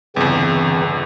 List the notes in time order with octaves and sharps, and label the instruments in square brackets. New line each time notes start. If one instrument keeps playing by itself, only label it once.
[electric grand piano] G1 E2 [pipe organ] C#3 E3 C4